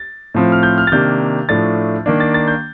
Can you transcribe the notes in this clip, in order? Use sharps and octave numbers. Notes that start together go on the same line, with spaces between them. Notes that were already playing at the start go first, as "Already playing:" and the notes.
Already playing: A6
A2 F3 C4
F6
G6
F6
A6
C3 D#3 A#3 D4 G6
A2 F3 A3 D4 A6
D#3 A#3 D4
A6
A6
G6